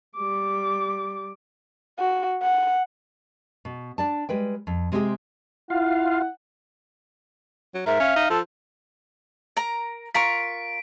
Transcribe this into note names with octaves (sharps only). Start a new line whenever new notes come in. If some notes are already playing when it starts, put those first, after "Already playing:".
G3 D6
F#4
F#5
B2
D4 D5 A5
G3 G#3 B4 G5
F2
C3 G#3 C4 D4 G4 G#4
E4 F4 F5 F#5
F#3
G#2 A#4 E5
C#4 F5
D#4
F3 A4
A#4 A#5
F4 A#4 C#6 B6 D7